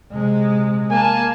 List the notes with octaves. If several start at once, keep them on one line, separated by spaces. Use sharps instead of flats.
C3 G#3
A#3 G#5 A5